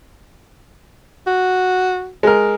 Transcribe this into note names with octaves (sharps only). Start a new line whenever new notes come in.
F#4
G#3 A#4